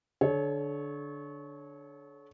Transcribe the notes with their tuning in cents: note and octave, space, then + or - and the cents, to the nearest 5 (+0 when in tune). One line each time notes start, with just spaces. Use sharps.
D3 +0 A4 -40 C#5 -5